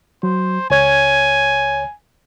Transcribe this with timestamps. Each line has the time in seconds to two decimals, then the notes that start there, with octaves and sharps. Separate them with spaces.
0.23 F#3 C5
0.70 C#2 C#5 G#5 G#6